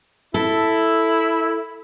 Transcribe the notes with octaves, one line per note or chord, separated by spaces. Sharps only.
E4 A4